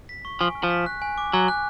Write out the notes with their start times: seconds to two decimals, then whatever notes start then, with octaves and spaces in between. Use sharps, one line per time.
0.09 B6
0.25 C#6
0.40 F3 G#5
0.55 F6
0.63 F3
0.70 B6
0.86 F#6
1.02 G#5
1.18 D6
1.33 F#3 G#5
1.48 F#6